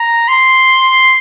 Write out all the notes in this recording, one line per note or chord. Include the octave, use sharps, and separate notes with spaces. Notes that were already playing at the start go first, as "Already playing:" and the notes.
Already playing: A#5
C6